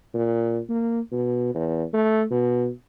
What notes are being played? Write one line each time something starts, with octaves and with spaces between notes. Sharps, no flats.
A#2
A#3
B2
E2
A3
B2